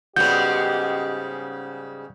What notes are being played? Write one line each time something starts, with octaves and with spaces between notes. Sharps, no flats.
G#2 C#3 G3 B3 F#4 G4 D#5 G6